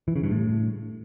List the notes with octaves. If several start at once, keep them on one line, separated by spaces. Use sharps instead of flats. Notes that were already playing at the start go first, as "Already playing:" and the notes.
E3
C#3
G2
A2